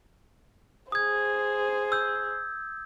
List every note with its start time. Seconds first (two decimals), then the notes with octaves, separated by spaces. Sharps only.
0.92 G#4 C5 D#6 G#6
1.92 E6 G6